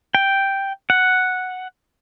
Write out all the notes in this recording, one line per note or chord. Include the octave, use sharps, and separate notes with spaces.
G5
F#5